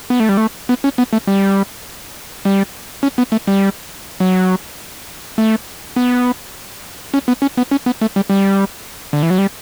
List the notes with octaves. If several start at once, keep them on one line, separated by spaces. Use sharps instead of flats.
B3
A3
G3
A3
B3
C#4
B3
A3
G3
G3
C#4
B3
A3
G3
F#3
A3
B3
C#4
B3
C#4
B3
C#4
B3
A3
G3
G3
D3
E3
F#3
G3